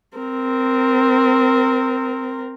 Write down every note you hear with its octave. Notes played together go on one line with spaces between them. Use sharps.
C4 A#4